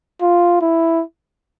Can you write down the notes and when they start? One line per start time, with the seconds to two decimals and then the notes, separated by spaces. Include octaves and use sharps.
0.22 F4
0.61 E4